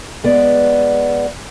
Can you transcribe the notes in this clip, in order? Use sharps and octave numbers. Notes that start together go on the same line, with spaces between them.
G#3 B3 D5